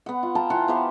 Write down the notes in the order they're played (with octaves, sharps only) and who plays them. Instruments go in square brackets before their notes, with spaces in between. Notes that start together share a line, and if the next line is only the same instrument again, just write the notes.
[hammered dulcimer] B3 F#5
F4
F5 G5 A5 A#5
E3 F4 F#5
B3 G4 C5 F5